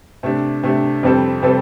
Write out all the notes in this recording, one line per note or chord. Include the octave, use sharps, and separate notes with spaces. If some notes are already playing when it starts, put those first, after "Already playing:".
C3 A3 D4
C3 A3 D4
F2 C3 G3 C4 A4
C3 G3 C4 A4